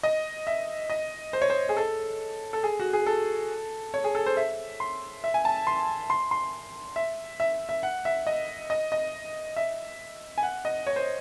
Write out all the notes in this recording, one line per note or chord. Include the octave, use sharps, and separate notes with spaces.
D#5
E5
D#5
C5
C#5
C5
G#4
A4
A4
G#4
F#4
G#4
A4
C#5
G#4
A4
C5
E5
C6
E5
G#5
A5
C6
C6
C6
E5
E5
E5
F#5
E5
D#5
D#5
D#5
E5
G#5
F#5
D#5
C#5
C5